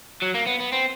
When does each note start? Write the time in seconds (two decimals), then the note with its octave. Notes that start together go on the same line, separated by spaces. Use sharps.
0.22 F#3
0.35 A#3
0.47 B3
0.60 B3
0.72 C4